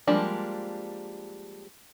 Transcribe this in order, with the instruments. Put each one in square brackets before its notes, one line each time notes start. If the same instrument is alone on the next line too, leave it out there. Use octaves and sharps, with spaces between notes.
[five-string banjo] F3 G3 G#3 A#3 D4